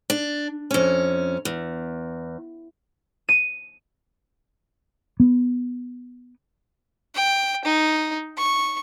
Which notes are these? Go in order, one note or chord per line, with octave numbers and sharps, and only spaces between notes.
D4
F2 C#4
E2
D#7
B3
G5
D#4
C#6